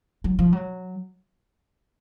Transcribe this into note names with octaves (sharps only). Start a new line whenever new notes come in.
F#3
F3
F#3